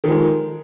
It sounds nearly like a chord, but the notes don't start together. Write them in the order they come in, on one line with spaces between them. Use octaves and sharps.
D#3 F3 G#3